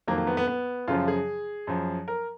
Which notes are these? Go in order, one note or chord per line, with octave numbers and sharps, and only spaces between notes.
F2 D#3 F#3 A#3
A#3
B3
B3
B3
F#2 C#3 F3 F4
G#4
F#2 F3
A#4